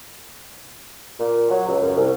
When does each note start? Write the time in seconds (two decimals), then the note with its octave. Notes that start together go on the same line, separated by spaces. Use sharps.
1.19 A#2
1.50 F#3
1.67 C#2
1.81 F#2
1.96 C2